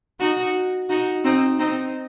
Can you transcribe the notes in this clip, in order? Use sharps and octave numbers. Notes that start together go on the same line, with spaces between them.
D#4 F#4
D#4 F#4
C4 D#4
C4 D#4